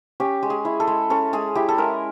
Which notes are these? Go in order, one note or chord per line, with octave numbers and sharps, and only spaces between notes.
C#4 G4
G#3
G#4
E4
A4
G#3
C#4 A4
G#3 G#4
E4 G4
A4
G#3 A#4